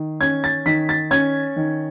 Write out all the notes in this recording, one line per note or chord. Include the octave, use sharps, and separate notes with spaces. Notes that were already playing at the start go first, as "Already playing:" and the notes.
Already playing: D#3
C#4 G#6
A6
D#3 B6
A6
C#4 G#6
D#3